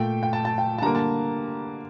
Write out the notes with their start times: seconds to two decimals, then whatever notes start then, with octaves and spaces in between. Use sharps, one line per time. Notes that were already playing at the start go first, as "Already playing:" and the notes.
Already playing: A#2 A3 G5
0.23 G5
0.33 A5
0.45 A5
0.58 G5
0.78 A5
0.82 D3 G3 A#3 A#5
0.95 A5